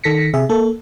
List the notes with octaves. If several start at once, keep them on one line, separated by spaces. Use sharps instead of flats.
D#3 A4 A#6 B6 C#7
C3 G#4 E5
A#3 A4